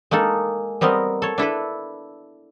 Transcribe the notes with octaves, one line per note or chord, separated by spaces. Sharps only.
G#3 A#3 D#4 A4
G3 B3 C4 A#4 D#5
A4 C#5
D4 E4 A4 B4